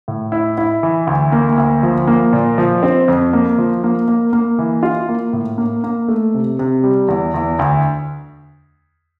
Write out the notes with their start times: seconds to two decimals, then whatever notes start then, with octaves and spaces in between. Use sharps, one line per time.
0.08 A2
0.32 E4
0.58 E4
0.83 E3
1.07 D2
1.32 A#3
1.58 D2
1.83 F3
2.07 A#3
2.33 A#2
2.58 F3
2.83 C4
3.08 F2
3.33 A#3
3.58 F3
3.84 A#3
4.08 A#3
4.33 A#3
4.59 E3
4.83 F4
5.09 A#3
5.33 A2
5.58 A#3
5.84 A#3
6.08 A3
6.34 C3
6.59 C3
6.84 G3
7.08 E2
7.34 E2
7.59 D2